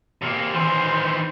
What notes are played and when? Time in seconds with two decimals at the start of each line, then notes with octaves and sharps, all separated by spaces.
0.22 C3 A#3
0.54 D#3 E3 C5